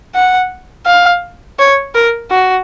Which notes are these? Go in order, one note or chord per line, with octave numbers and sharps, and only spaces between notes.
F#5
F5
C#5
A#4
F#4